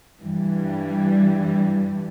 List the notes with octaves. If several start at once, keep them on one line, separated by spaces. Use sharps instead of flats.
G2 E3 G3